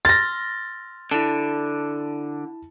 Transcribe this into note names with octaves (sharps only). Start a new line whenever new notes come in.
C6 F6 A6 A#6
D3 E4 A5